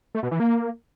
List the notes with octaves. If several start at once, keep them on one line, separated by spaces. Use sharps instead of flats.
A3
B2
E3
A#3